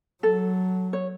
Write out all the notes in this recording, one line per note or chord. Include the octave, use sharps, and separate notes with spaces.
F#3 A4
C#5